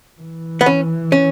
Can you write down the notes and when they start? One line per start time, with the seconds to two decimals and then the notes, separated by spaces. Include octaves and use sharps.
0.21 E3
0.61 B3
0.66 C#4
1.12 C#4